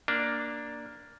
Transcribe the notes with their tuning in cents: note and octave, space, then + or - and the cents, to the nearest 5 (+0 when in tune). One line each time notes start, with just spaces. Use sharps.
A#3 +0 D4 +0